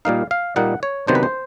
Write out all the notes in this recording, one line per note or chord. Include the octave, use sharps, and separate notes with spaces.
A#2 G3 A#3 D#4 F5
F5
A#2 G3 A#3 D#4 F#5
C#5
C3 D#3 F#3 B3 D4 C5
B4
C5